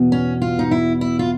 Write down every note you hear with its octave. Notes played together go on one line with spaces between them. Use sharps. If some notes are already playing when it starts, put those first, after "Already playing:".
Already playing: E2 B2
C#4
F4
D#4
E4
E4
F4